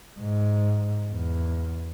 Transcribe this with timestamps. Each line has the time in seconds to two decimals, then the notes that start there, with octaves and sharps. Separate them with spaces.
0.20 G#2
1.12 E2